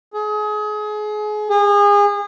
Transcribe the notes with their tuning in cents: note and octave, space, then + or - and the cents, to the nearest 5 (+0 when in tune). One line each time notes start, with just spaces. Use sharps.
G#4 +30
G#4 -30